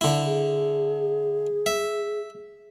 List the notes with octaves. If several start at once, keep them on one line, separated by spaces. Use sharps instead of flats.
D3 E4
G#4
E5